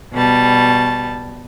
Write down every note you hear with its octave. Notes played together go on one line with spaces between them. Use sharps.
B2 G3 A5